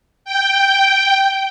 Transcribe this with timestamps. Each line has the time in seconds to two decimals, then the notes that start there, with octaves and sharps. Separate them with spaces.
0.25 G5